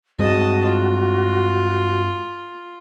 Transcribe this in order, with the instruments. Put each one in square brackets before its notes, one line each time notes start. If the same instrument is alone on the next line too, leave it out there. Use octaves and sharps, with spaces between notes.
[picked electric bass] G2 G#3 C4 [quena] F#4 [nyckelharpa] D#5 A5
[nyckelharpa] F4